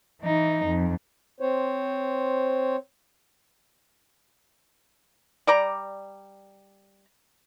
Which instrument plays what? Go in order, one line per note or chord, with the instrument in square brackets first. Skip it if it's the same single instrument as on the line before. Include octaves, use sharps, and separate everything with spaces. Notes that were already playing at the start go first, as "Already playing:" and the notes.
[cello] E3 D#4
F2
[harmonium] C4 C5 C#5
[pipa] G3 D5 A#5